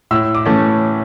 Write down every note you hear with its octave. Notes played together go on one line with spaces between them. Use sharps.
A2 E6
D6
E3 A3 C#4